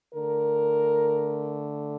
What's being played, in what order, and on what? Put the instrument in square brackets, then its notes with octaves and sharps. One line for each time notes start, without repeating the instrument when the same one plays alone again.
[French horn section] D3 A3 A#4